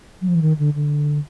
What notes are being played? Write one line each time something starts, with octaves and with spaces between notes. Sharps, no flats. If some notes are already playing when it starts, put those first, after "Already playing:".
F#3
F3
E3
D#3
D3
D3